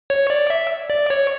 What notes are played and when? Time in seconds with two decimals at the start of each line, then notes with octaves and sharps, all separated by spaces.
0.10 C#5
0.30 D5
0.50 E5
0.90 D5
1.10 C#5